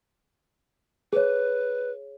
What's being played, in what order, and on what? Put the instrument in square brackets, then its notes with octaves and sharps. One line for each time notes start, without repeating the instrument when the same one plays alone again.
[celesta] G#4 C#5 [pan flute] B4